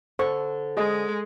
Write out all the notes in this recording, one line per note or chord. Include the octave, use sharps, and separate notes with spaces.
D3 A4 C5 C#6
G#3 G#4 D#5